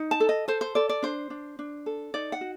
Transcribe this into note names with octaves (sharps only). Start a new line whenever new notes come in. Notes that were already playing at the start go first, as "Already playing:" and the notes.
Already playing: D#4
A5
A4
D#5
A4 C5
C5
A4 D5
D5
D4 C5
D4
D4
A4
D#4 D5
F#5
F#4